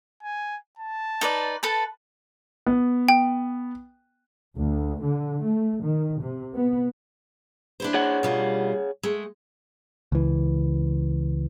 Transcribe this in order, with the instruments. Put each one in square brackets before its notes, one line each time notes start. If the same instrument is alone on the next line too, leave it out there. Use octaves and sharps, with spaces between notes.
[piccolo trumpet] G#5
A5
[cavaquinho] D#4 B4 D5
A4 B4 A5
[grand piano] B3
[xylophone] G5
[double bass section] D2
D3
A3
D#3
C3
B3
[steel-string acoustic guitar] D4 E4 C5
[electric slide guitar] G#4 C#5 F#5
[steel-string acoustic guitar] B2 G3 F4
G#3 A3
[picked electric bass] C#2 E3